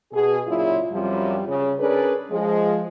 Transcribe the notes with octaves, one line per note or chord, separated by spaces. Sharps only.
B2 G#4
A#2 C#3 F#3 E4 F4
F#2 C3 F3 G3
C#3
C#4 D4 G#4 A#4 B4 D5
F3 G#3